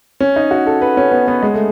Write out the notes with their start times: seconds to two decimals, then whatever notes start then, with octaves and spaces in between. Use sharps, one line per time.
0.20 C#4
0.36 D#4
0.51 F#4
0.67 A4
0.82 B4
0.97 C#4
1.12 B3
1.28 B3
1.42 G#3
1.54 A3